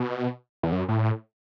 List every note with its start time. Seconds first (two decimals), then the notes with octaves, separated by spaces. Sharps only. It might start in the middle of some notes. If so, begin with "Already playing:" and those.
Already playing: B2
0.63 E2
0.72 F#2
0.89 A2